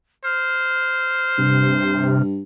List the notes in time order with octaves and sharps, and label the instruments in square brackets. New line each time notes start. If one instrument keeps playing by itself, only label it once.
[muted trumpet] C5 [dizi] F6
[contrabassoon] G2 [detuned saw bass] C3